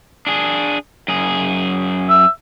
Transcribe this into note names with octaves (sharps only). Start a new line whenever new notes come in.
D4 G#4
F#2 G#4
E5